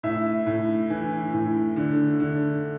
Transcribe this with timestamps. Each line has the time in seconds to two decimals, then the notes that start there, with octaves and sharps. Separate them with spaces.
0.03 A2 E5
0.46 A2
0.90 E3
1.33 A2
1.76 D3
2.20 D3